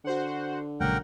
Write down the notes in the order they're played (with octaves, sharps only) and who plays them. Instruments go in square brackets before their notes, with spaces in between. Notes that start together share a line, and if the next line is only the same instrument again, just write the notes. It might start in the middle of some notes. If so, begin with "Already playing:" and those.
[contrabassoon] D3 [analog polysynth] F#4 C5 F#5
[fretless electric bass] A#1 C#3 G#3 [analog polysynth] F#3 A#3 [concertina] A#4 F#5 G5